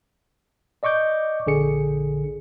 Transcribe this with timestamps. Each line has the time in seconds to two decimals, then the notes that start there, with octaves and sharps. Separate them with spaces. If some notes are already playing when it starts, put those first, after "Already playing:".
0.83 D5 D#5 C#6 D6 G6
1.46 A#1 D3 G#4 C#7